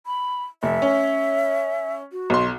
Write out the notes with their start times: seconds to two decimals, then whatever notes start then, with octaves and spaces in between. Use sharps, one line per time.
0.06 B5
0.63 F1 E5
0.82 C#4
2.12 F#4
2.30 B1 C6